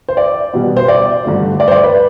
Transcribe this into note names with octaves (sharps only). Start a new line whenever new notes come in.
C5
D5
B2 G3 B3
C5
D5
G2 D3 A3
D5
C5
D5
B4